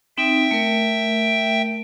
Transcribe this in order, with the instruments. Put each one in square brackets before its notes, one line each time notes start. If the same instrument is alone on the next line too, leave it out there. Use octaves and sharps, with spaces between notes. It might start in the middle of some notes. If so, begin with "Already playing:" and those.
[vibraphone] C4 D#4 [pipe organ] E5 G5
[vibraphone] A3 A#4